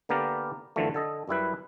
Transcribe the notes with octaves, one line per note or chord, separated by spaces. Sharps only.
D3 A#3 B3 G4 A#4 D5
F#2 D3 E3 F3 A3
D3 A4 D#5
F#2 G3 E4 B4